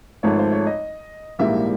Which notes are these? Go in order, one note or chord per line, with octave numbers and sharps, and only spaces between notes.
G#1 G#2 F3 A3 C#5
C5
C#5
D#5
A#1 G#2 E3 G3 A#3 E5